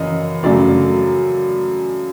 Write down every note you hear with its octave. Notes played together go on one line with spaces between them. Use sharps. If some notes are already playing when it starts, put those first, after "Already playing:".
Already playing: F#2 C#3 E3 D#5
F#2 C#3 F#3 A3 D4 D5